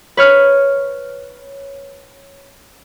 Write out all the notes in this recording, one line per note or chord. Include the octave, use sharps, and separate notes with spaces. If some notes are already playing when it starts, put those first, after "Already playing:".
B4 C#5 F6